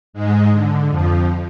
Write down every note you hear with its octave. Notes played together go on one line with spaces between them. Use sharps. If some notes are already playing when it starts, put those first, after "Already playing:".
G#2 G#3
D3
F2 F3